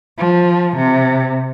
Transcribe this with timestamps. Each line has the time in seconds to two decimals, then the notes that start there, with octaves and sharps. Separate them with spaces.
0.18 F3
0.76 C3